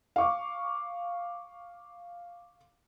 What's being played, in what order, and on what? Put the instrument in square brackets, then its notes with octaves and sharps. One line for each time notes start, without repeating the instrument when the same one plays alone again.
[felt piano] F5 C#6 D6